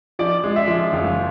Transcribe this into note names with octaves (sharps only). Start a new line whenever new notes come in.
F3 D5
G#3
E5
F3
F#1